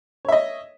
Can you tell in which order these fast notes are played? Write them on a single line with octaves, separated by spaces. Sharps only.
C#5 E5 D#5